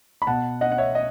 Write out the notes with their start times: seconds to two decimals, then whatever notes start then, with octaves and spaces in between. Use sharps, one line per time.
0.22 B5
0.27 B2 F#5 A5
0.61 D#5 F#5
0.72 F#5
0.78 C#5 E5
0.95 D#5